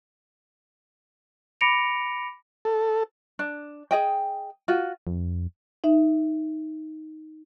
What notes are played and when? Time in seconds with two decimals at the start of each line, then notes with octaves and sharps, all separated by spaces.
1.61 B5 D6 A#6 C#7 D7 F7
2.65 A4
3.39 D4
3.91 G#4 D#5 G5
4.68 F4 F#4
5.07 F2
5.84 D#4 E5